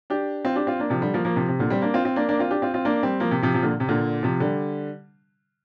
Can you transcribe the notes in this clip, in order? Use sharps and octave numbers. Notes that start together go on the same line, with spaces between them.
D4 G4
C4 F4
D4 G4
C4 F4
A#3 D4
C3 F3
D3 G3
F3 A#3
F3 A#3
C3 F3
C3
A#2 D3
G3 C4
A#3 D4
C4 F4
C4 F4
A#3 D4
A#3 D4
C4 F4
D4 G4
C4 F4
C4 F4
A#3 D4
G3 C4
F3 A#3
C3
C3 F3
C3 F3
A#2 D3
C3
A#2 D3
C3 F3
D3 G3